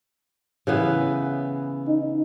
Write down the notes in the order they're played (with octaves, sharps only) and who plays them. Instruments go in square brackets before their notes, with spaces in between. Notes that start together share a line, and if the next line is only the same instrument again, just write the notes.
[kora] C#3 E3 B3
[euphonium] D#4